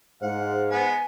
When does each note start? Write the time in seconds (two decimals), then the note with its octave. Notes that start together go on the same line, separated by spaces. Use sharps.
0.22 G#2 C5 F5 F#5
0.71 G#3 B3 F#5 G#5